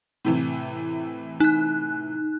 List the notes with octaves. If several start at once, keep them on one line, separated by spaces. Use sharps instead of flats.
A2 C3 E3
D#4 F#6